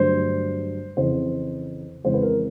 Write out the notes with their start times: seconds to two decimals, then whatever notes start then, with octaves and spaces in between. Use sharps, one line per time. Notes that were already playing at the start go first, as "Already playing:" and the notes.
Already playing: G2 D3 F#3 A3 C5
0.97 F2 C#3 E3 C5
2.04 F2 C#3 E3 G#3 C5
2.14 B4
2.23 A#4